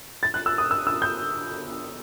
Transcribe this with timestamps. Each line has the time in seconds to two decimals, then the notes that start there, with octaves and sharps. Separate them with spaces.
0.23 A6
0.34 F#6
0.46 E6
0.58 D#6
0.71 E6
0.87 E6
1.02 G6